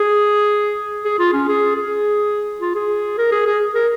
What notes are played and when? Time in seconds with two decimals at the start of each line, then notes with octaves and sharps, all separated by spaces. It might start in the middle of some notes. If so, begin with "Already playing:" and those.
Already playing: G#4
1.05 G#4
1.19 F4
1.33 C#4
1.48 G#4
1.76 G#4
2.60 F4
2.75 G#4
3.18 A#4
3.31 G#4
3.46 G#4
3.75 A#4